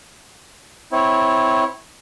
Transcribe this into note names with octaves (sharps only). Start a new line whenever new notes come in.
C4 E4 C#5